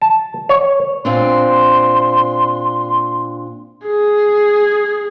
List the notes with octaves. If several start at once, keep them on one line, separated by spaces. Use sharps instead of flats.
A5
C#5
A#2 C4 D4 C6
G#4